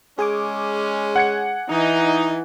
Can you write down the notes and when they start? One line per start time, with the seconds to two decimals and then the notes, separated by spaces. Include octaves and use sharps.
0.19 G#3 C#4 G#4 G#5 D6
1.16 F#5 G#6 C#7
1.70 E3 D#4